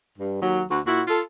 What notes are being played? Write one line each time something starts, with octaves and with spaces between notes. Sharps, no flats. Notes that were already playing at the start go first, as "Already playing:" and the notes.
G2
D#2 F#3
D2 F#4
A#2 E4 F#4
F4 A4